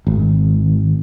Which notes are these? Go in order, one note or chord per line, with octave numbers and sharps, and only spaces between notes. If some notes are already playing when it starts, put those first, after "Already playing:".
G#1